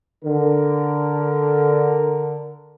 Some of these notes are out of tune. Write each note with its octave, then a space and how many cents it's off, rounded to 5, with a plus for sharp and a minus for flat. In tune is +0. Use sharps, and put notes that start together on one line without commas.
D3 +0 A#4 +0